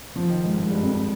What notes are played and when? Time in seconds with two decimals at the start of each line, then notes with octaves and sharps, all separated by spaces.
0.16 F3
0.30 D#3
0.44 G#2
0.58 G#2
0.70 G2
0.83 F2